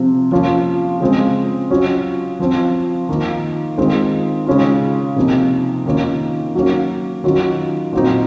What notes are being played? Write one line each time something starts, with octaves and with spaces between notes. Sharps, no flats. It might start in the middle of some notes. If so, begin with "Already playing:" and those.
Already playing: C3 F3 C4
F3 A#3 C#4 F4
C#3 G#3 C4 F4
F#3 C#4 F4
F3 C4 F4
D#3 A#3 F4
D#3 G#3 C4 F4
C#3 G#3 C#4 F4
C3 F3 A#3 D#4
D#3 A#3 C#4 F4
F#3 A#3 C#4
D#3 F#3 C#4 F4
A#2 F#3 C4 D#4